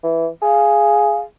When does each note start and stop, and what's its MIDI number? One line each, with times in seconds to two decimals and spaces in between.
0.03 0.28 52
0.42 1.23 68
0.42 1.18 77